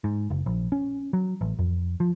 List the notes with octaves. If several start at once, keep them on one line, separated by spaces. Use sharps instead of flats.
G#2
F#1
A#1
C#4
F#3
A1
F2
F3